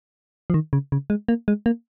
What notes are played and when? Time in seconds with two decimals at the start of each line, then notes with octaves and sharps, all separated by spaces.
0.50 F3
0.54 D#3
0.73 C#3
0.92 C#3
1.10 G#3
1.28 A#3
1.48 G#3
1.66 A#3